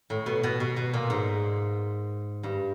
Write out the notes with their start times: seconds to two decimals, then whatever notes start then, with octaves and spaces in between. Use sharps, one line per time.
0.10 A2
0.26 B2
0.43 B2
0.60 B2
0.76 B2
0.93 A#2
1.10 G#2
2.43 G2